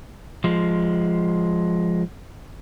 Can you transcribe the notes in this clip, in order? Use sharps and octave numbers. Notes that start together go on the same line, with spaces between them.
F3 G#3